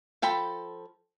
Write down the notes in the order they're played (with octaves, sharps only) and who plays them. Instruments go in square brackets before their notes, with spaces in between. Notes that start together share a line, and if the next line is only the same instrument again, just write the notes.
[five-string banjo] F3 A4 G5 B5